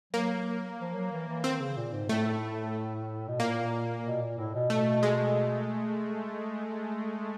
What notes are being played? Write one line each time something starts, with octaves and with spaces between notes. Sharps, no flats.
F#3 A#3
F3
F#3
E3
E3
D#3 C4
C#3
A#2
G#2
A2 A3
B2
A#2 A#3
B2
A#2
A2
B2
B2 A3
G#3